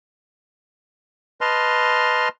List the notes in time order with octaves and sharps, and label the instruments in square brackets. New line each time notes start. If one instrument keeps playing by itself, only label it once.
[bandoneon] B4 D#5 A5 C6 F6